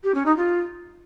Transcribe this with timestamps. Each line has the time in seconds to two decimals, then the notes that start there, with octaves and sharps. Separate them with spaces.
0.03 G4
0.14 C#4
0.25 D#4
0.36 F4